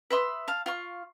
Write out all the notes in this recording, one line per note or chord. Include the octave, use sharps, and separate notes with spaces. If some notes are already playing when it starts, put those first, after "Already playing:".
B4 E5 C6 D#6
F5 A5
F4 F5 C#6